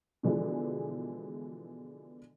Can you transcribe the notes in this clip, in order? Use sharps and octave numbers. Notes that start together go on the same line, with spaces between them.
B2 D3 E3 F3 G#3